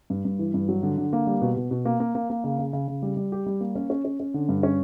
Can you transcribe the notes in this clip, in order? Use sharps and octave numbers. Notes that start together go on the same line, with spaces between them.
G2
G2
E3
G2
F#3
D3
D3
A#3
G3
B2
B2
B2
A#3
A#3
A#3
A#3
C#3
C#3
C#3
C#3
G3
G3
G4
G3
A#3
C#4
C#4
C#4
C#4
D3
G2
C#4